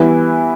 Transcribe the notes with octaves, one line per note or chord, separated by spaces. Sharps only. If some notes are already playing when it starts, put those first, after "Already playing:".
Already playing: E3 G3 B3 E4 B4